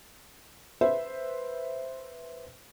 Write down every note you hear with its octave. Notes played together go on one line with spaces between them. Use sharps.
B4 C5 E5